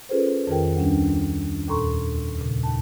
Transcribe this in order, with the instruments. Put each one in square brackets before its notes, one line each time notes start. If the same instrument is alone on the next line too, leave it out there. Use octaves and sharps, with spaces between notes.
[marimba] C#4 F4 G#4 A4 B4 C5
F2 D#3 F4 G#4 A#4 G5
D2 G3 C#4 D4
D#2 A#2 A4 A#5 C6 C#6
A#2 C#3
D#2 A5